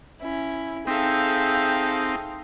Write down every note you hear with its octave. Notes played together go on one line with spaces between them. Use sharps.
C#4 E4
C4 D#4 G#4 A4 E5 F5 G5